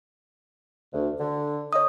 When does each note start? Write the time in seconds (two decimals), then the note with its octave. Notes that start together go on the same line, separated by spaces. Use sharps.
0.93 D2
1.20 D3
1.73 C#5 D#5 D#6